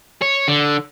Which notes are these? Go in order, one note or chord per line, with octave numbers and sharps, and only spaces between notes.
C#5
D3